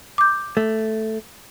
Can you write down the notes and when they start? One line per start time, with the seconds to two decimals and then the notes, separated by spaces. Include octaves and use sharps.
0.18 D6 G6
0.57 A3